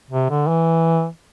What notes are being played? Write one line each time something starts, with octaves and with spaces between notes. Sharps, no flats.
C3
D3
E3